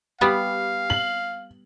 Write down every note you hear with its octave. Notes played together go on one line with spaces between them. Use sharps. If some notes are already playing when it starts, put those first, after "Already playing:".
G3 B3 G4 F5
F#7